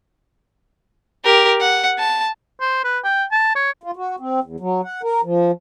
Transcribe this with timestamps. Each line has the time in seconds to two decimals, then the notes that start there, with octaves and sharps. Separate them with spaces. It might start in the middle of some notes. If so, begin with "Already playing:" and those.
1.25 G4 A#4
1.60 F#5
1.99 A5
2.60 C5
2.84 B4
3.04 G5
3.32 A5
3.56 C#5
3.83 F4
3.96 F#4
4.20 C4
4.44 E2
4.60 F#3
4.84 F#5
5.03 A#4
5.24 F3